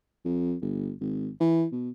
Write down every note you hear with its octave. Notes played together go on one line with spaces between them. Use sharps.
F2
G1
G#1
E3
B2